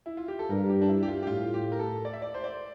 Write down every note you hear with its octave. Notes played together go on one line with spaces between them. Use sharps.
E4
F4
G4
A4
G2 A#4
G4
D4
E4
G4
F4
G4
A2 F4
G4
A#4
A4
D5
E5
D5
C5
D5